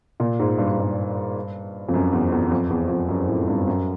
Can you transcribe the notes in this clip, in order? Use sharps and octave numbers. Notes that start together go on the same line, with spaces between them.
A#2
G#2
G2
G#2
G2
F2
F#2
E2
E2
F2
E2
F2
F#2
A2
G2
F#2